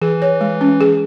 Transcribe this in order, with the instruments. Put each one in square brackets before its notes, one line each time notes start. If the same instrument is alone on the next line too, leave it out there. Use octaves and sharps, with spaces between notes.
[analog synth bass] E3 [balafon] G#4
[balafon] C#5
G#3
C#4
G#4